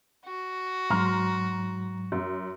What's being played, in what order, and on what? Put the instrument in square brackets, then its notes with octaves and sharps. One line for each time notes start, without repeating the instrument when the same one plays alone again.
[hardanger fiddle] F#4
[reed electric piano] G#2 F#3 [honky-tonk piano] A#5 C6 F6
[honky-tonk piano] F#2